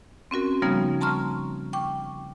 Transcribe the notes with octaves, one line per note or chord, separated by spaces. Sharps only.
C4 C#4 F#4 A#4
C#3 F3 G3 A#3 B3 D#4
A5 A#5 C6 C#6 F6
G5 C#6 D6